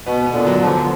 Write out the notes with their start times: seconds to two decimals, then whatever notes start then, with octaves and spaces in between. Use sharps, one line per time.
0.06 B2 B3
0.26 B3
0.33 A#2 D3
0.47 F#3
0.60 D3 F3
0.66 F#3